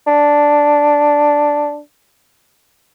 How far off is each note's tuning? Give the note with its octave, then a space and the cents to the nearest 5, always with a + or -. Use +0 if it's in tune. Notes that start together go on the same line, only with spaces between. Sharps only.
D4 +0